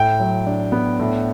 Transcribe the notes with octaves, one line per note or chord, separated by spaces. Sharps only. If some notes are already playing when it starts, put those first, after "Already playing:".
Already playing: A2 G5
F#3
D4
B3
A2